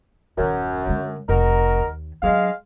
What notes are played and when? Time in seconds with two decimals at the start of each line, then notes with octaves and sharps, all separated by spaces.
0.38 D#1 F#2 D#3
0.87 D3 G#3
1.29 F1 D#4 F#4 A#4
1.80 D#2
2.23 F#3 G#3 D4 F5